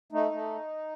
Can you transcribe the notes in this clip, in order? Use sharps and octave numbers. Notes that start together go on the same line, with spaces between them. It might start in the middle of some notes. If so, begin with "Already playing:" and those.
A3 D#4
A3